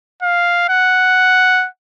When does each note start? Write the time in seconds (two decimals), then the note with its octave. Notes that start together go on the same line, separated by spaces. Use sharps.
0.22 F5
0.69 F#5